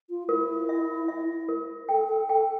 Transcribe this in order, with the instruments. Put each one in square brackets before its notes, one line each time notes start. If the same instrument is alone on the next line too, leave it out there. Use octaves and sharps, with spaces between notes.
[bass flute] F4
[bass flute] E4 [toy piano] A#4
[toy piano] E5
E5
A#4
[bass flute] A4 [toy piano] G5
[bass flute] A4
[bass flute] A4 [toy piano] G5